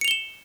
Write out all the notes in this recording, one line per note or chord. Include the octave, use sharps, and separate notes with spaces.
C#7 E7 F7 G7